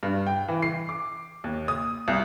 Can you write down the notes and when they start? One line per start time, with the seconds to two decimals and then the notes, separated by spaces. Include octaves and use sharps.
0.03 G2
0.27 G5
0.48 E3
0.62 C7
0.89 D6
1.44 D#2
1.68 D#6
2.08 C2